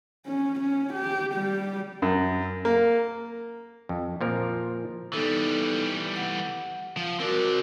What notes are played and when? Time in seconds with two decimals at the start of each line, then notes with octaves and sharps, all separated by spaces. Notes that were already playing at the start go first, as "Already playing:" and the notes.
0.26 C#4
0.60 C#4
0.93 G4
1.33 G3 G4
2.02 F#2
2.65 A#3
3.89 F2
4.21 A#2 F3 A#4
5.13 E3 G3 B3 D#4 A4
6.16 F#5
6.97 F3
7.20 C4 F#4 A#4 D5